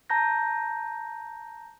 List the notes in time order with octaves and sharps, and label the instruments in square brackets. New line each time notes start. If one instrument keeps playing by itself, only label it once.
[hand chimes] A5 A#5 G6 A#6